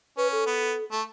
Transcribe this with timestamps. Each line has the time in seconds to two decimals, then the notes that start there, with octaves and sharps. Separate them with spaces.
0.17 C#4 B4
0.32 A4
0.47 B3
0.91 A3